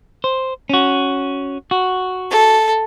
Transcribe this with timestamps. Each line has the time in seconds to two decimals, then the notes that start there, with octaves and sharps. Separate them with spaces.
0.24 C5
0.69 C#4 F#4
1.71 F#4
2.30 A4